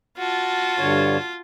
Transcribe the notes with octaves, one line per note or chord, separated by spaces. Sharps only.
F4 F#4 A5
G2 D3 C#5